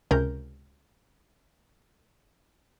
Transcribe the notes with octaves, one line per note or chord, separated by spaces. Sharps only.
C#2 C3 C#4 A#4 G6